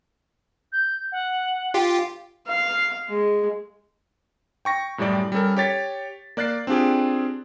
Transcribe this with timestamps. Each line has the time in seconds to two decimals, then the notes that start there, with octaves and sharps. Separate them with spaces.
0.72 G6
1.12 F#5
1.74 F4 G4
2.48 F5
3.09 G#3
4.65 G5 C#6 A#6
4.98 F#2 A2 G3 G4 D5
5.32 G3 C#4 A4 A#4
5.57 G4 C#5 A6 B6
6.37 A#3 D5 F#6 A6 C7
6.67 C4 D4 F4 G4 G#4